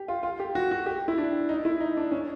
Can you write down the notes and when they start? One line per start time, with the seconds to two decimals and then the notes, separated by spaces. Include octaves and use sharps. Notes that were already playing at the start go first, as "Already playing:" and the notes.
Already playing: G4
0.08 F4
0.23 F4
0.40 G4
0.55 F#4
0.71 F#4
0.86 G4
1.08 E4
1.18 D4
1.49 D#4
1.65 E4
1.81 D#4
1.97 D4
2.12 C#4